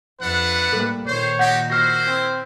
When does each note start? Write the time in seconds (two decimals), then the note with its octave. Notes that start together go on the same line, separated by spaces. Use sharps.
0.21 F2 D4 B4 E5 F#5
0.73 A2 G3 A#3 A4
1.06 A#2 D#3 C5 C#5
1.39 D#4 F#4 G4 F#5 G6
1.70 E4 F#4 C5 F6 A#6
2.07 C4